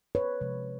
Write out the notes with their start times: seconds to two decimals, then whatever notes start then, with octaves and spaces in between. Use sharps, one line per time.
0.15 B4 C#5
0.41 C3 F3 G#3